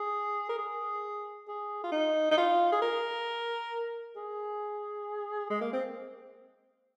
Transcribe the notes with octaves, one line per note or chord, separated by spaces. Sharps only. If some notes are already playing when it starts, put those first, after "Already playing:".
Already playing: G#4
A#4
G#4
G#4
F4
D#4
D#4
F4
G#4
A#4
G#4
G#3
A#3
C4